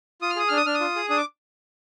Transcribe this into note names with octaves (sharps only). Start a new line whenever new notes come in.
F4 D#6
F6
G#4 D#6
D4 F6
D#6
D4 F6
D#6
F4
G#4
D4 D#6
D6